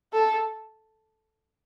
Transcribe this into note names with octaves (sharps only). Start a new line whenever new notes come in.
A4